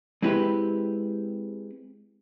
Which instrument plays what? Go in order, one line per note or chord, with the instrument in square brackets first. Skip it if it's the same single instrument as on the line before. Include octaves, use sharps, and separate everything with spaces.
[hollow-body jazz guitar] G#3 C4 E4 G4 B4